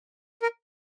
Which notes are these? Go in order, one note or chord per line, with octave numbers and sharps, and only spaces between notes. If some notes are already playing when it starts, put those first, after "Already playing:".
A#4